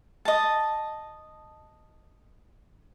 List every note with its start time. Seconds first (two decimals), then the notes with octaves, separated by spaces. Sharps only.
0.25 D#5 A5